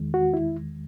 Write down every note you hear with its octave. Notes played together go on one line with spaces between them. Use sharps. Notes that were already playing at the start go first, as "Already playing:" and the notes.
Already playing: E2 D#3 G#3
F#4
E4